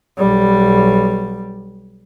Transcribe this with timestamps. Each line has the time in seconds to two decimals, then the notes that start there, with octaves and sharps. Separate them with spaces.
0.18 B1 G3